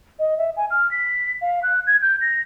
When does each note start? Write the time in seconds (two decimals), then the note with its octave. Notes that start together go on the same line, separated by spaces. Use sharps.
0.19 D#5
0.38 E5
0.57 G#5
0.71 F6
0.91 B6
1.42 F5
1.63 F#6
1.87 G#6
2.02 G6
2.21 A#6